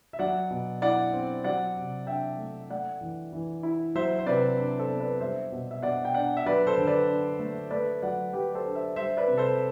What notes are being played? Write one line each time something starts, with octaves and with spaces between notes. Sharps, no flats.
E5
F#3 D5 F#5
B2
E4 D5 F#5
C4
F#3 D5 F#5
C3
D4 E5 G5
A3
A3 D5 F#5
E3
E3
E4
F#3 C5 E5
C5
C3 B4 D5
D4
A4 C5
B3
B4 D5
G3 C5 E5
B2
E5
B2 D5 F#5
G5
D4 D5 F#5
E5
F#3 B4 D5
A4 C5
D3
B4 D5
D4
A3
A3 B4 D5
F#3 D5 F#5
F#3 G4 B4
A4 C5
D4
C5 E5
G3 C5 E5
B4 D5
C3
A4 C5